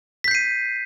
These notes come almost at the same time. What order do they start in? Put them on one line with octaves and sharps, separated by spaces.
B6 G6 C7 D#7